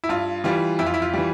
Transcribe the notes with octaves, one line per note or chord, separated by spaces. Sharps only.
E4
G2 F4
E3 G3 F4
F2 E4
F4
E4
F4
E3 G3